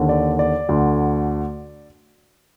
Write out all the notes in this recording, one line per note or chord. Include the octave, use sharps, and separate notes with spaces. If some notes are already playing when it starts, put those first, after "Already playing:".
Already playing: D#2 D3
D5
D5
D2 D3